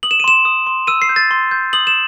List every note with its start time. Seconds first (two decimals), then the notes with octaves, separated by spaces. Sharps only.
0.03 D#6 F#7
0.11 E7
0.20 D#7
0.24 C6 E7
0.45 D#6
0.67 C6
0.87 E6 D#7
1.02 C7
1.09 G6
1.16 A6
1.31 C6
1.51 G6
1.73 D#6 F#7
1.87 E7